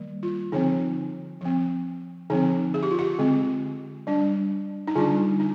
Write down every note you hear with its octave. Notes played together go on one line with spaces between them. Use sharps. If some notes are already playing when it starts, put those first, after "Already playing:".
Already playing: D#3 G3 A#3
F4
D3 F3 C4 D#4
F3 C4
D3 F3 C4 D#4
G#4
G4
F4
G4
D3 G#3 C4
G3 D4
D#4
D3 G3 D4 F4
D#4